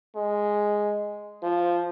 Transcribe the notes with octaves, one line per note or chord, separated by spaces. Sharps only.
G#3
F3